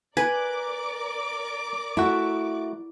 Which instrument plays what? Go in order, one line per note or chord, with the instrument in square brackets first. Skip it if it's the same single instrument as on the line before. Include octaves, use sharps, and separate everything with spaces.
[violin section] A#4 D5 D6 [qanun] B4 [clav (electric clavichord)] G#5
[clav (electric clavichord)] A3 F#4 [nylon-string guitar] E4